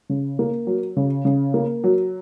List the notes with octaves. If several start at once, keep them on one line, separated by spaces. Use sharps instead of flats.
C#3
A#3
F#3
C#3
C#3
A#3
F#3